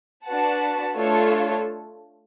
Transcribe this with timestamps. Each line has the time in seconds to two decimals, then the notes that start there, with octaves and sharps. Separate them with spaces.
0.25 D4 F#4 B4 F#5 A5
0.95 A3 D4 F4 A4 C#5